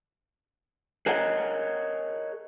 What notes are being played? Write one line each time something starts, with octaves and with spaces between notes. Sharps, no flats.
G#4 A#4 C#5 D#5 F#5